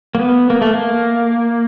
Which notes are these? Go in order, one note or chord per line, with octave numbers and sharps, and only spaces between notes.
A#3
B3
A#3
A3
A#3